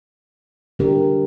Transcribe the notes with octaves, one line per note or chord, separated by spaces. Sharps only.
D3 G3 D4 G4 A#4